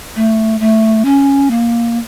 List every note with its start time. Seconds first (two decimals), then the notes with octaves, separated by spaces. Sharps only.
0.16 A3
0.60 A3
1.05 C#4
1.50 A#3